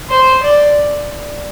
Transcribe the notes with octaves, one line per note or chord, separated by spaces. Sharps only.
C5
D5